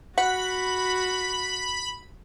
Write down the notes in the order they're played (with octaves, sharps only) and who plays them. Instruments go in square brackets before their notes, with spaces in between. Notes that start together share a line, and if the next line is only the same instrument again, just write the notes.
[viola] F#4 [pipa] F#5 [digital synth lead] B5